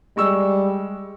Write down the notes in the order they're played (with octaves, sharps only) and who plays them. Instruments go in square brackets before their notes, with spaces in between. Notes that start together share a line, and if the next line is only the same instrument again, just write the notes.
[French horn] G3 [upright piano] G#3 C#6 E6